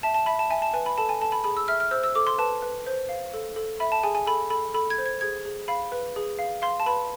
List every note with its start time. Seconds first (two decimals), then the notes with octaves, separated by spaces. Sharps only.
0.03 E5 A5
0.14 A5
0.26 E5 B5
0.39 A5
0.50 E5 G#5
0.62 A5
0.74 B4 G#5
0.86 B5
0.98 A4 A5
1.09 G#5
1.21 A4 A5
1.32 B5
1.44 G#4 B5
1.57 E6
1.68 E5 F6
1.80 F6
1.91 C5 E6
2.04 E6
2.15 A4 D6
2.27 C6
2.38 B4 A5
2.62 B4
2.86 C5
3.09 F5
3.34 A4
3.56 A4
3.80 E5 B5
3.92 A5
4.03 G#4 G#5
4.15 G#5
4.27 A4 B5
4.50 A4 B5
4.74 A4 B5
4.90 G#6
4.98 C5
5.06 G#6
5.21 G#4 G#6
5.45 G#4
5.68 F5 B5
5.92 B4
6.16 G#4
6.39 F5
6.62 F5 C6
6.80 A5
6.86 B4 B5